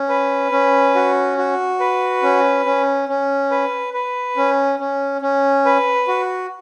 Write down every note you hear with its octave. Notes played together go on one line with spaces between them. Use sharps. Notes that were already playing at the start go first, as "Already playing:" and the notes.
Already playing: C#4
B4
C#4
F#4
F#4
B4
C#4
C#4
C#4
B4
B4
C#4
C#4
C#4
B4
F#4